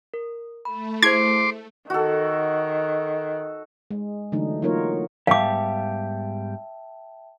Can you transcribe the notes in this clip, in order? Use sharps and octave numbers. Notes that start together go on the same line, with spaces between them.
A#4
A3 B5
E4 G#4 C5 C6 D6 G#6
D#3 F#4 A4
G#3
D3 E3 F#3 A3 D4 D#4
F#3 A#3 D#4 F4 A#4 C#5
G#2 G3 B3 E5 F5 G5 A5 D6